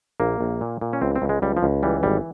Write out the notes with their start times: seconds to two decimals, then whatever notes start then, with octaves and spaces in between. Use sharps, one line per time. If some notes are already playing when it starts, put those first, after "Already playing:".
0.20 A#1 A#3
0.41 A#1
0.61 A#2
0.81 A#2
0.93 C#4
1.02 C#2 C4
1.16 C4
1.22 C#2
1.29 G#3
1.42 C#2 G3
1.57 F3
1.63 C#2
1.83 E3 G3
2.03 G#1 G3